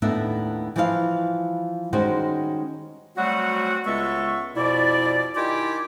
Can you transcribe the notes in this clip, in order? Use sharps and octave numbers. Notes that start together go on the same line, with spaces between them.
D#2 A2 B3 D4 A#4 E5
E3 F3 G3 B4 D#5 F5
D#3 G3 G#3 C#4 F#4 C5
F#3 G3 A3 C4 F#4
C#2 G#3 B3 A4 E5 C#6
F2 B2 E4 D5
D#3 E4 F4 G4 G#5 D6